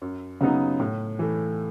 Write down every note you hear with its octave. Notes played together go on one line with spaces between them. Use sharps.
F#2
C#3 F#3 B3 D#4
A2
E3 A3